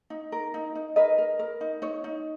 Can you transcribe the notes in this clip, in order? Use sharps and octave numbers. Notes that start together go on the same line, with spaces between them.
D#4
A#4
D#4
D#4
A#4 B4 D#5
A#4
A#4
D#4
D#4 C#5
D#4